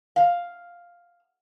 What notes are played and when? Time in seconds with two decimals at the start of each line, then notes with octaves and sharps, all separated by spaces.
0.16 F5